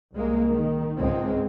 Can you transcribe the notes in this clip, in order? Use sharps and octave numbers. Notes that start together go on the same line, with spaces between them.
C2 G#3 A#3
D#3
C#2 G#2 G#3 C4